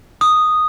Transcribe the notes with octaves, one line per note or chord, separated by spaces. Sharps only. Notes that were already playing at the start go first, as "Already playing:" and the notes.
D#6